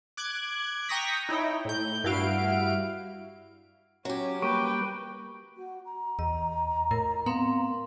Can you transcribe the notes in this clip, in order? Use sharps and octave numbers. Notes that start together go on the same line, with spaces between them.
D6 F#6 G#6
G5 A#5 C#6 D#6 A#6 B6
D#4 E4 C#5 G5
A2 G6
G2 E4 F#4 F5 D7
F#3 C#4 G4
G3 A#3 B4 G5 C#6 D6 D7
F#4
A#5
E2 D#5
A2 A#4
B3 C4 F5 C6